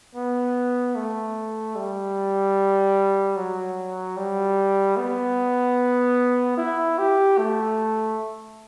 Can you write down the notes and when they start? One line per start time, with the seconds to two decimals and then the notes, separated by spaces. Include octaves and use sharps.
0.15 B3
0.96 A3
1.76 G3
3.37 F#3
4.17 G3
4.97 B3
6.58 E4
6.98 G4
7.38 A3